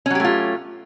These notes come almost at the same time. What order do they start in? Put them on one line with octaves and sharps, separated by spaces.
C#4 F#3 G4 A3 F4